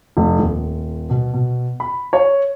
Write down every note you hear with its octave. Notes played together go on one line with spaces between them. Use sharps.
F1
D#1
B2
B2
B5
C#5